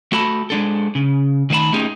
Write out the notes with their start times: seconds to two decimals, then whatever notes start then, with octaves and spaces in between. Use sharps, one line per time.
0.12 A3 F#4 A4 A5 B5
0.50 G#3 D4 A4
0.95 C#3
1.50 D#3 A3 C5 A5 B5
1.73 A3 C#4 D#4 F4 G4 G#4